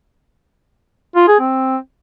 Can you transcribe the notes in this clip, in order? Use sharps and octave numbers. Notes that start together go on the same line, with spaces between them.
F4
G#4
C4